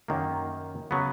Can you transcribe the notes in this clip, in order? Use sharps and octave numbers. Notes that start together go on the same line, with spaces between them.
F#2 D#3 A#3
C#3 F#3 B3